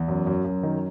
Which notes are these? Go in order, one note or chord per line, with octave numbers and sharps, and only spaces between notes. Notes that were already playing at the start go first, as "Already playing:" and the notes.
Already playing: E2
F#2
F#2
F#2
D#3